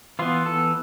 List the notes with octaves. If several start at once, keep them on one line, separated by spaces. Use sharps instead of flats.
E3 B3 F4
A4